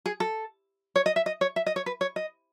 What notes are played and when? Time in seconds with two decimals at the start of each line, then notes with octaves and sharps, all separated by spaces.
0.06 G#4
0.20 A4
0.96 C#5
1.06 D#5
1.16 E5
1.26 D#5
1.41 C#5
1.56 E5
1.66 D#5
1.76 C#5
1.86 B4
2.01 C#5
2.16 D#5